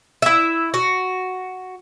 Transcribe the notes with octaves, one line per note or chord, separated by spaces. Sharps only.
E4 E5
F#4